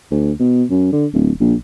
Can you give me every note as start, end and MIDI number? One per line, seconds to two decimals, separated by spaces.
0.11 0.32 38
0.39 0.64 47
0.70 0.90 42
0.92 1.06 50
1.13 1.31 26
1.40 1.54 34